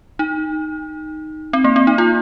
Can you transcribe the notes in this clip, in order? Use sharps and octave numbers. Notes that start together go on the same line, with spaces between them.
D#4
C4
A#3
C4
D#4
F4